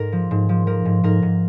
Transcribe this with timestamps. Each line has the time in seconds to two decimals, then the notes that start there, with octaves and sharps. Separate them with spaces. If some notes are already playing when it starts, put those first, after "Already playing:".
Already playing: G#2 A#4
0.12 F3
0.31 G#2
0.49 F3
0.67 F3 A#4
0.85 G#2
1.04 G#2 A#4
1.22 G#2